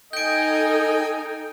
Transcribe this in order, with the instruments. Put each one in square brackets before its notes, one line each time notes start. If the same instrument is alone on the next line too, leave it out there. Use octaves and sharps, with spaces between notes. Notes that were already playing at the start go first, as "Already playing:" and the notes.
[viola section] D#4 A4 [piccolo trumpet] D#5 [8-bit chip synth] G5 G#5 [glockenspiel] G6 D7